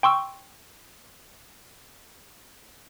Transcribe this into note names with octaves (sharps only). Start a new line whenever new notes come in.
G5 C6 C#6 E6